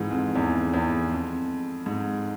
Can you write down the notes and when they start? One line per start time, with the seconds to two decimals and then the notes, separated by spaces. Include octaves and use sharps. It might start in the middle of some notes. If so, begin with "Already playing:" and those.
Already playing: G#2 E3
0.10 F2
0.35 E2
0.74 E2
1.11 F2
1.86 G#2